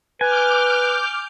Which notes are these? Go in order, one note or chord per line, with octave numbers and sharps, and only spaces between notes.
B4 G#5 D6 F6 G6